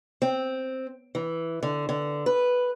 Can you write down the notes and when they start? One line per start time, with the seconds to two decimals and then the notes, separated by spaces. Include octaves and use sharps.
0.22 C4
1.15 E3
1.63 D3
1.89 D3
2.26 B4